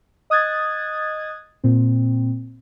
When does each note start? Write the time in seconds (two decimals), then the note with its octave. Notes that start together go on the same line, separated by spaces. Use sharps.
0.30 D#5 D#6 F#6 G#6 A6
1.64 A#2 C4